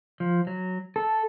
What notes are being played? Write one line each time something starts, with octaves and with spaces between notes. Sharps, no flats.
F3
F#3
A4